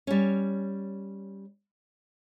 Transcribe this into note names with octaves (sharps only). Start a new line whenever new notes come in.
G3 C#4